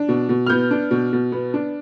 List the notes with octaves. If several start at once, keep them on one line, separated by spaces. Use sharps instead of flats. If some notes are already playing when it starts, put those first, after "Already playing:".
Already playing: D4
B2
B2
F6
B3 G6
D4
B2
B2
B3
D4